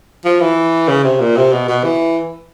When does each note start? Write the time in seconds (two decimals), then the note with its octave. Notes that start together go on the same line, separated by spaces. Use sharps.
0.25 F3
0.40 E3
0.88 C#3
1.04 C3
1.20 A#2
1.37 C3
1.52 B2
1.69 B2
1.84 E3